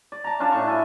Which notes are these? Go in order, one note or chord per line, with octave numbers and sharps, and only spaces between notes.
D5
A5 A#5
C#4 D4 F4 A5
A2 C#6
E4 F#4 A4 G#5